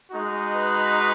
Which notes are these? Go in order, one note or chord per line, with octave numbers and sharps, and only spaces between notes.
G#3 D#4 F#4
B4